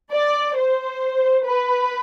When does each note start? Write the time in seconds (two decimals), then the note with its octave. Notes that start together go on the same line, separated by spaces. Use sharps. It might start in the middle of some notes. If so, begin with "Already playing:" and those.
0.12 D5
0.56 C5
1.46 B4